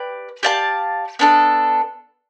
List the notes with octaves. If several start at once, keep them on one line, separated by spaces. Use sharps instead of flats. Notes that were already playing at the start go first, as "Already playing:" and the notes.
Already playing: G4 B4 D5
G4 D5 F5 A5
B3 D4 A4